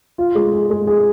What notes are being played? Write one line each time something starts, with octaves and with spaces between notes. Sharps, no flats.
F4
G#3
G#4
G#3
G#4